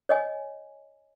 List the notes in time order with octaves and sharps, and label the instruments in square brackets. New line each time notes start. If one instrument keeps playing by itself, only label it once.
[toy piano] C#5 D#5 G#5